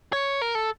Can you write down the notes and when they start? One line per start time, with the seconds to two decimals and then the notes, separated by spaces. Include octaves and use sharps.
0.13 C#5
0.42 A#4
0.55 A4